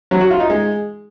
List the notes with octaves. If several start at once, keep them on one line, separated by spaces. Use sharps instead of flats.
F#3
F#4
F4
D#4
G#3